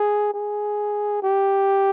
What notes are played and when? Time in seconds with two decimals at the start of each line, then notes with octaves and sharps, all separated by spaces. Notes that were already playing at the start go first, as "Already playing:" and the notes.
Already playing: G#4
0.34 G#4
1.23 G4